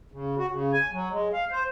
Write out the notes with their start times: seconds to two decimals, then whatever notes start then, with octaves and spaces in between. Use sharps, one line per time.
0.12 C#3
0.38 F#4
0.51 C#3
0.72 G#5
0.92 F#3
1.11 G#3
1.33 F5
1.52 C5